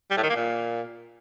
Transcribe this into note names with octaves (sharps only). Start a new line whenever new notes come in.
G3
A2
D#3
A#3
A#2